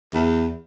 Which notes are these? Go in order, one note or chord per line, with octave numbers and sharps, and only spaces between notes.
E2